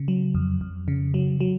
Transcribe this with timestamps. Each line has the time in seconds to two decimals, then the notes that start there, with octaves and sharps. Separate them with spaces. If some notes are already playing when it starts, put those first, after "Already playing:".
Already playing: C#3
0.08 F#3
0.35 F2
0.61 F2
0.88 C#3
1.14 F#3
1.40 F#3